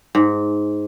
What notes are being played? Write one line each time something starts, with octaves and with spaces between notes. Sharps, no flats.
G#2